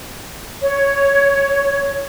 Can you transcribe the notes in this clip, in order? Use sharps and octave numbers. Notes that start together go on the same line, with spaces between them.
C#5